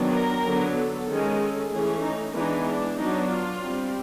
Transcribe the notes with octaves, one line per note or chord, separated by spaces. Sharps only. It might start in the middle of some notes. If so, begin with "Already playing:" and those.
Already playing: D#3 F#3 B3 D4
A#4
D3 F#3 B3
A4
D#3 G#3 C#4
A4
E3 A3 C#4 G#4
D#4
E3 G#3 B3 D4 D#4
D4
F#3 B3 D4 D#4
F4
G3 C4